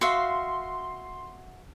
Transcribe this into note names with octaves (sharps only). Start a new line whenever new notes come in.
F#4 E5 F5 C6